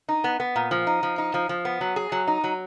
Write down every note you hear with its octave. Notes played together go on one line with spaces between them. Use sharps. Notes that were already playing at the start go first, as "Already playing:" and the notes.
D#4
B3
B3
A#2
F3
D#4
F3
D#4
F3
F3
B3
F#3
G#4
F#3
D#4
F#3